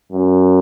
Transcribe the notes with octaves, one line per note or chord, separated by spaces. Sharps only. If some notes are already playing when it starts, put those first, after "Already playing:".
F#2